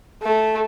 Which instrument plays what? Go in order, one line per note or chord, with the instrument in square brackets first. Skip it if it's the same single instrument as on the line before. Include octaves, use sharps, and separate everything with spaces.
[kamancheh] A3